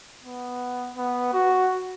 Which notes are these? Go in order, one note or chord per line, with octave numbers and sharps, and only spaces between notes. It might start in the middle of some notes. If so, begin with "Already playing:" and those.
B3
B3
F#4